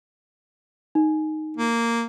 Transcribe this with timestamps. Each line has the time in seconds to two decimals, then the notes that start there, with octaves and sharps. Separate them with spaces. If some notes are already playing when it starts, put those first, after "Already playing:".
0.95 D#4
1.57 A#3